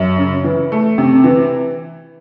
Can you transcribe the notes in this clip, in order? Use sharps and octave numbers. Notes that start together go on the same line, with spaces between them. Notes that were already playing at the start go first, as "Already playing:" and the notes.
Already playing: F#2
C#3
E3
A3
C3
E3